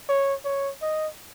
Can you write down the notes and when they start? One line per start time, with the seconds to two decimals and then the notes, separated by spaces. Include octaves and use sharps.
0.09 C#5
0.45 C#5
0.82 D#5